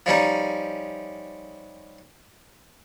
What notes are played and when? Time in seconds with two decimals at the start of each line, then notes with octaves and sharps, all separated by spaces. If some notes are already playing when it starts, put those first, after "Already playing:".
0.06 F3 G3 C#4 D#4